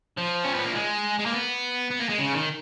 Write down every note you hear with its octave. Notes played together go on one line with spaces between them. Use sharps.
F3
C#4
B3
A#3
G#3
G#3
A#3
B3
B3
A#3
G#3
C#3
D#3